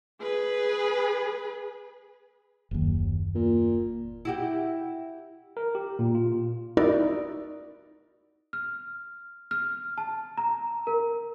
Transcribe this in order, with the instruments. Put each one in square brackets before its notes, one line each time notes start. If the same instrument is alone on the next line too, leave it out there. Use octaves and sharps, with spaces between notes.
[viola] G#4 B4
[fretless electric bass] F#1 D#2
[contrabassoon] A#2
[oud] E4 F#4 G4
[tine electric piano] A#4
G4
A#2
F4
[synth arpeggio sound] D#4 E4 F#4 A#4 D5
[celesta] F6
F6
A5
A#5
A#4